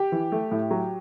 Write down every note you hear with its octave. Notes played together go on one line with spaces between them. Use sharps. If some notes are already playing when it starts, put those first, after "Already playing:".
Already playing: G4
E3
A3
A2
F#3